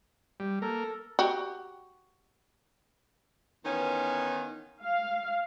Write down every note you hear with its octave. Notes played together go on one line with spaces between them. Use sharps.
G3
A#3 A4 A#4
F#4 G4
D#3 E3 B3 C#4 F4
F5